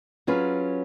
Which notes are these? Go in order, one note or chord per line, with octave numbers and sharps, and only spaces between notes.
F#3 C#4 F4 G#4 B4